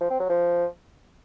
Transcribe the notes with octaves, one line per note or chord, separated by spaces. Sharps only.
F3
C4
F#3
F3